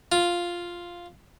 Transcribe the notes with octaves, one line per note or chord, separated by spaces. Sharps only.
F4